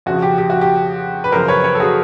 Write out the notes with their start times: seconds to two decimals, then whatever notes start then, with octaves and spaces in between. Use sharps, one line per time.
0.06 F2 C#3 F3 F#4
0.22 G4
0.38 G4
0.50 F#4
0.61 G4
1.24 B4
1.32 F#2 C#3 F3 A#4 C5
1.48 B4 C#5
1.64 B4 C#5
1.75 A4
1.80 F#4 G#4